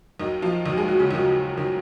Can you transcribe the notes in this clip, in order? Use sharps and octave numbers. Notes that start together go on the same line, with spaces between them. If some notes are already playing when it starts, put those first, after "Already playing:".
D#2 D#3 F#3 D#4
F3 F4
D#2 D#3 F#3
G#3 G#4
F#3 F#4
C#3 C#4
D#2 D#3 F#3
D#3 F#3